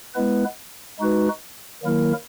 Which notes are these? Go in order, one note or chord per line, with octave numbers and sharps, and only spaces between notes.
G#3 B3 E4 B4
G#3 D#4 F#4 B4
D#3 F#3 A#3 E4 A#4